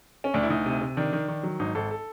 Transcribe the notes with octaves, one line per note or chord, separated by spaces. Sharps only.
C#4
D2 D4
E4
D2 D#4
C3
C3
D#3 D4
D#3
D#3
F#3
G#1 D#4
G#1 A4
A4